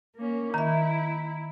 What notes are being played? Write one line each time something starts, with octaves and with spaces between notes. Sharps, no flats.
A#3 C#4
D#3 E4 E5 A#5